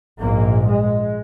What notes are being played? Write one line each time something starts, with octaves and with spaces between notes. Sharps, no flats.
A#1 G#2 A#3
G#3